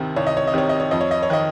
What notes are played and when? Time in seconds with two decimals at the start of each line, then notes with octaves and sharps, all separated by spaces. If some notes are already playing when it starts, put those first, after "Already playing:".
Already playing: C2 C3 D#3
0.16 C2 C#5
0.27 D#5
0.37 C#5
0.47 D#5
0.54 C3 D#3 C#5
0.69 D#5
0.80 C#5
0.91 F2 D#5
1.01 C#5
1.11 D#5
1.23 C#5
1.30 D#3 D#5